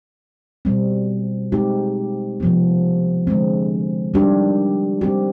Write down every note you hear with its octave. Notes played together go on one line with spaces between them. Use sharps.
B2 G3 C4
G#3 C4 D#4 G4
C3 F3 B3
D3 G#3 C4
D#3 G3 D4 G4
G3 C4 G4